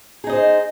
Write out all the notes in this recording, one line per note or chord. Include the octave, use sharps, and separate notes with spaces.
D#4 G#4 C5 D#5